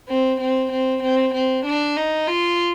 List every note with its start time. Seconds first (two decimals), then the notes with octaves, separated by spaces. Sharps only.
0.09 C4
0.40 C4
0.71 C4
1.03 C4
1.34 C4
1.65 D4
1.97 D#4
2.27 F4